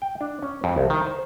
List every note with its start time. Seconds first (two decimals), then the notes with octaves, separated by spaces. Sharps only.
0.02 G5
0.21 D4
0.42 C#4
0.64 F2
0.76 C2
0.90 D#3
1.06 C5